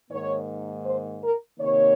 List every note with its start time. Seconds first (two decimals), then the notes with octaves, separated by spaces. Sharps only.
0.10 G#2 D#3 A#3 C#5
0.85 C5
1.22 A#4
1.59 C3 D#3 A#3 C#5